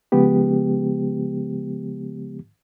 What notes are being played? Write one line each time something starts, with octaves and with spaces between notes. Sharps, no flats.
C#3 F3 G#3 B3 G4